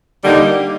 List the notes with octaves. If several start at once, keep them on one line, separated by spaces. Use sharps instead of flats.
D3 G3 A#3 D#4 G4